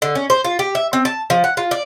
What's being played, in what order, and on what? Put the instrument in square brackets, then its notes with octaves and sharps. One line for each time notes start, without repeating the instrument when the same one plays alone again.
[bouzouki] D3
C#4
C5
F4
G4
E5
C4
A5
F3
F#5
F4
D5